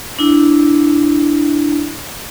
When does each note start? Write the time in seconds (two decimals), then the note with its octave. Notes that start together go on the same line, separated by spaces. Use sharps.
0.19 D4 E4